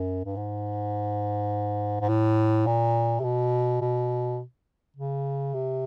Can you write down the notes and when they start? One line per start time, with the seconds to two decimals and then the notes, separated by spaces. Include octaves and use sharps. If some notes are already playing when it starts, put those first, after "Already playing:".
Already playing: F#2
0.25 G2
0.36 G#2
2.01 G#2
2.09 A2
2.67 A#2
3.20 C3
3.24 B2
3.81 B2
4.97 C#3
5.54 C3